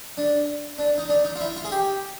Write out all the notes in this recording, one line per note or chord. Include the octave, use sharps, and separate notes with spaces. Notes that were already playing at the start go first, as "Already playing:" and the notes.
D4
D4
D#4
D4
D#4
F4
E4
F4
G#4
G4